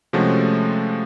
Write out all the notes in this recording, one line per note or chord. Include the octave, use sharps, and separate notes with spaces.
C3 F3 G#3 A3 C#4 F#4